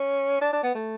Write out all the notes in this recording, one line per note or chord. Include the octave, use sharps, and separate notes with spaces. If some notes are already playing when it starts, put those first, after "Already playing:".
Already playing: C#4
D4
D4
B3
A3